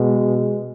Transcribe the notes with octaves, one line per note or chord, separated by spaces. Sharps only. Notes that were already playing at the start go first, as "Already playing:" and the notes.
Already playing: B2 G#3